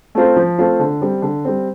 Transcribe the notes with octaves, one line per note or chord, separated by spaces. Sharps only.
A3 C4 F4 C5
F3
A3 C4 F4 C5
D3
G3 C4
D3
G3 C4